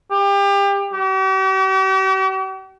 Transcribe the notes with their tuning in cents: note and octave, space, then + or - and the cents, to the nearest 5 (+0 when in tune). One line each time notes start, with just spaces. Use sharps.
G4 +30
G4 -45